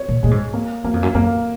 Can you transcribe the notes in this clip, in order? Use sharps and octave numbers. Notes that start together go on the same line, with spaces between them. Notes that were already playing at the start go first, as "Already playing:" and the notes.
Already playing: C#5
A#2
A#2 G#3
G#2
A#3
F#2 A#3
F2
F#2
F#2 A#3